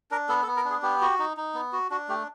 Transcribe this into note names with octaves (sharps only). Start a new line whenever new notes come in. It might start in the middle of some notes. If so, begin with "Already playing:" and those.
D4 A#4
B3 A4
A4
B3
A#4
D4 G#4
B3 G4
F#4
D#4
D#4
B3
F#4
D4 F#4
A3 G4